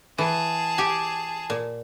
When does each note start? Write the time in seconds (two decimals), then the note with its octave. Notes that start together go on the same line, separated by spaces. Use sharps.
0.18 E3 G#4 A5
0.78 G4 G#5
1.50 A#2